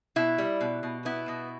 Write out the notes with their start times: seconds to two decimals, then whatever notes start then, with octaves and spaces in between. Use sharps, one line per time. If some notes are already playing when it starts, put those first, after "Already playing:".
0.16 B2 E4
0.38 G3
0.61 B2
0.83 B2
1.05 B3 E4
1.28 B2